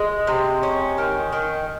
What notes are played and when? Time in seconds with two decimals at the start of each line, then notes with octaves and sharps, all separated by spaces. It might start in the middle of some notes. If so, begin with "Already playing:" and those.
Already playing: G#3
0.27 C3
0.63 C#4
0.98 D#3
1.32 D#3